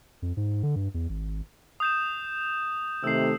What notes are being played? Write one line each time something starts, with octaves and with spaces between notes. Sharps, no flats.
F2
G#2
D3
G2
E2
G#1
D#6 G6 E7
C3 D#3 A3 E6 C7